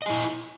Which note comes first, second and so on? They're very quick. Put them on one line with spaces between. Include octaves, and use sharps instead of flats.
D#5 G#5 E4